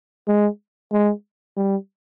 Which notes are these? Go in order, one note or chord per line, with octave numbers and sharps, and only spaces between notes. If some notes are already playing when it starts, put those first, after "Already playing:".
G#3
G#3
G3